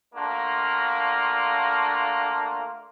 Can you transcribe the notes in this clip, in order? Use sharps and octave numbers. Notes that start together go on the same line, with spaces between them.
A3 A#3 D4 F4 F#4